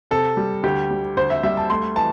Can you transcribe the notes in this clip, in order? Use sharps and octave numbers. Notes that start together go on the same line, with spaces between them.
C3 A4
G3
D2 G4
G3
D2 C5
E5
G3 E5
A5
A3 C6
E3 A5